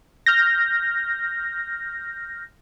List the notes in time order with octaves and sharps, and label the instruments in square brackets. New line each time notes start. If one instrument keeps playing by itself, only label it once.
[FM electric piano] F6 G6 A#6